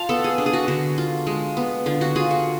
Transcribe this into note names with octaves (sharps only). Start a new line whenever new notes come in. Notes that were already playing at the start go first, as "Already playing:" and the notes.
Already playing: F4 F5 A5
B3 A4
G#4
D4
G#4
F#4
D3 F#4
F4
G#3
B3
D3 F4
F#4
F4 G#4
F#4